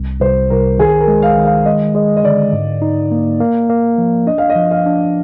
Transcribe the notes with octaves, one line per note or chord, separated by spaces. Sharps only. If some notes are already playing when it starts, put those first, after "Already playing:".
Already playing: C2
C2 C5
C2 A#4
D#3 G#4
A#4
G#3
F5
D#3
F5
G#3 D#5
G#3 D#5
D#5
D3 D5
G#2
D#4
A#3
A#3
A#3
F3
D4 D#5
F5
D#5
F3
F5
D4